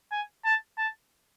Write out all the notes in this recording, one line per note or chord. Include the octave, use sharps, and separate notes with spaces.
G#5
A5
A5